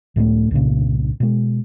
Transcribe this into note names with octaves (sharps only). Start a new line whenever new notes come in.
C#2 A2 G3 A3
C2 G2 A#2 C#3
B2 G#3